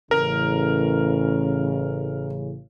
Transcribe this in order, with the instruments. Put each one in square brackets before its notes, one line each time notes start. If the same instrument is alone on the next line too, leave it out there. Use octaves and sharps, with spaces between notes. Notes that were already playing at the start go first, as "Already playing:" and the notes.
[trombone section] A1 C#3 [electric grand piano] A#4